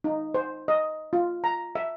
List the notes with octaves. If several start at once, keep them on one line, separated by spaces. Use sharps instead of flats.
D#4
C5
D#5
F4
A#5
E5